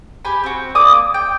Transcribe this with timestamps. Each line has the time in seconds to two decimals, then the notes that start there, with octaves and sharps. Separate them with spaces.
0.25 G4 G#5 B5
0.44 C4 F#4
0.75 A#3 D5 D6 D#6
1.14 G5